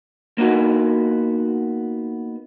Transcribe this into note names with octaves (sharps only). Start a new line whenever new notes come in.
A#3 B3 D#4 F#4